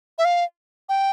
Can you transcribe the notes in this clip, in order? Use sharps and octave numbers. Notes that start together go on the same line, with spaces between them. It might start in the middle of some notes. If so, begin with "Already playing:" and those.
E5
F5
G5